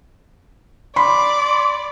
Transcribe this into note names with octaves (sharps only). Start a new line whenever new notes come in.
D5 B5 C6